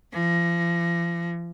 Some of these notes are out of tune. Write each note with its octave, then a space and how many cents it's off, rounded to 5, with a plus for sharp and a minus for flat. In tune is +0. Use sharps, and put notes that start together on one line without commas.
F3 -40